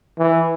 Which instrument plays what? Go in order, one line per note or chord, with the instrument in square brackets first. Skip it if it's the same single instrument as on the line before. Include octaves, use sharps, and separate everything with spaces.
[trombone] E3